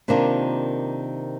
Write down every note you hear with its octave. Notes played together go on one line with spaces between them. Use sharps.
C3 D#3 A#3 D4 F4